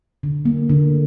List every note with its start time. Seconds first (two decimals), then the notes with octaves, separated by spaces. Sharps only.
0.23 D3
0.45 A#3
0.69 D3